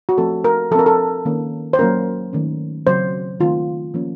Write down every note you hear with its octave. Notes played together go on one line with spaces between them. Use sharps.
F#4
F3 A3 C4 A4
A#4
F3 C4 A4 A#4
A4
D#3 A#3 C#4
C5
F#3 A#3 C#4 A#4
D#3 A3 C#4
C#3 F#3 C4 C5
D#3 A3 C4 F4
F3 A#3 C#4